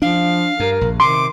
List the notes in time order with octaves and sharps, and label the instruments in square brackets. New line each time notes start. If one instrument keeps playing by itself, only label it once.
[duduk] F3 [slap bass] D4 [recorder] F5
[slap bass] G2 [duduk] A#4
[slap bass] A#1
[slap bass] C3 [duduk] D#3 [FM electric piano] C6 [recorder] D6